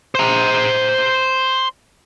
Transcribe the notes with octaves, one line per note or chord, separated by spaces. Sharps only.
C5 A#5